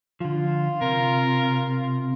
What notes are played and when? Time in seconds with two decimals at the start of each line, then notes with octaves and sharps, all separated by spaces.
0.20 D3 F3 F4
0.81 C3 A#4